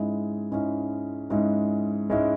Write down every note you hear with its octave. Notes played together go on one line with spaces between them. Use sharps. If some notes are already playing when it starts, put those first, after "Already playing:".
Already playing: G#2 G#3 C#4 E4
G#2 G#3 C#4 E4
G#2 G#3 C#4 E4
G#2 G#3 C#4 E4